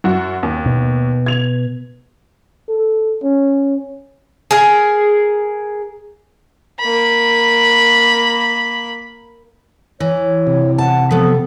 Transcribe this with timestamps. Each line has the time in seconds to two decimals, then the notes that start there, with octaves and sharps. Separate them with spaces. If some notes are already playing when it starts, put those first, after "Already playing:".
0.04 F#2 F#4
0.43 D#2
0.66 B2
1.26 G#6 F7
2.69 A4
3.23 C#4
4.51 G#4 A#4
6.80 A#3 B5
10.00 E3 C#5
10.47 C3
10.78 F#5 A5
11.11 F3 B3 A4